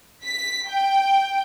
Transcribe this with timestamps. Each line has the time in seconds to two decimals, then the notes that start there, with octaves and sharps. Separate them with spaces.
0.24 B6
0.69 G5